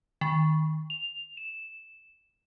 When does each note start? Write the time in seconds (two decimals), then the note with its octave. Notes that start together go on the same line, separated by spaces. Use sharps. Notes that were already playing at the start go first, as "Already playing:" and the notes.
0.21 D#3
0.90 F7
1.37 E7